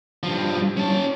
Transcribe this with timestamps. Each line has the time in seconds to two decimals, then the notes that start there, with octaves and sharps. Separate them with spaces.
0.23 G2 F3
0.77 C#4 A5